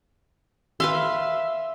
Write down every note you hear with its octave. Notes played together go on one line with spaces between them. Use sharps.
B4 E5 F5 C6